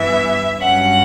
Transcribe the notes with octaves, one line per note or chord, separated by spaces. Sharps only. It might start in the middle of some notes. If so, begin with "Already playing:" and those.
Already playing: G2 E3 B3 E5
G2 F#3 C#4 F#5